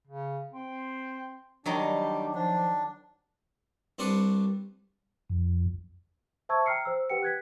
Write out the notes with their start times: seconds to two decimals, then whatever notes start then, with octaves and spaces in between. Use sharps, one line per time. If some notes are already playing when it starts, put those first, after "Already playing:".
0.07 C#3
0.51 C4
1.66 D#3 F#3 G3 D4 D#4
2.35 F3 D4
3.99 C2 C4 D4 B4 C6 C#6
5.29 F2
6.49 C5 E5 A5 C#6 E6 G#6
6.66 G5 A#5 F6 C7 C#7
6.85 C5 E6
7.10 G4 B4 F#5 G5 C#7
7.23 F#6 G#6 B6